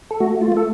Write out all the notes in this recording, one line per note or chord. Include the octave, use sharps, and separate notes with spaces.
A4
A3 F#4
F4
A3 A4